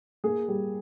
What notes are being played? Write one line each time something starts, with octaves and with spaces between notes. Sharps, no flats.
A#3 G#4
G3